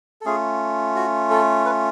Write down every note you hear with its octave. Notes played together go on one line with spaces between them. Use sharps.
A4
A3 C#4 F4 G#4
F#4
A4
B4